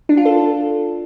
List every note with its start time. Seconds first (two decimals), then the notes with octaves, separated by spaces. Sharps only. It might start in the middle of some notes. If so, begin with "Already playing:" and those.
0.09 D4
0.17 F4
0.25 A4